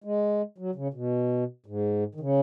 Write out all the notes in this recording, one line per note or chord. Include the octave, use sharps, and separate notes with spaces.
G#3
F#3
C#3
B2
G#2
D#3
C#3